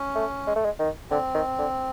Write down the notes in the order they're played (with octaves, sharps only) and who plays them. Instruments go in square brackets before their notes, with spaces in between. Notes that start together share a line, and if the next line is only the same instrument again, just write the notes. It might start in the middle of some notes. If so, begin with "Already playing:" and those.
Already playing: [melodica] C#4
[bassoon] A3
G#3
A3
G#3
D#3
[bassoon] D3 [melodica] C4
[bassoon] D#3
D3